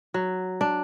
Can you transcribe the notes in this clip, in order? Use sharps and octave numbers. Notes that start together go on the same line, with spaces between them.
F#3
D4